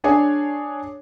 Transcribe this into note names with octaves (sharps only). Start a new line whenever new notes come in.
D4 G#4 C#5 G#5